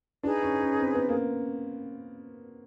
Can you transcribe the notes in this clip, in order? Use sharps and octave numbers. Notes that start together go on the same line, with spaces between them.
D4 D#4 G#4 B4
C#4
C#4
C4
B3
A#3